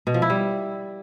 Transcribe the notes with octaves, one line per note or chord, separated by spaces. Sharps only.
B2
F3
E4
G3